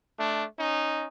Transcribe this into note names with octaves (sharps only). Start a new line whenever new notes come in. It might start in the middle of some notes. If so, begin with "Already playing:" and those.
A3 D4
C#4 D#4